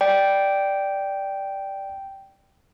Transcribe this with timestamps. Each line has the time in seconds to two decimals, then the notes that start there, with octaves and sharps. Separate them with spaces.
0.01 D5 G5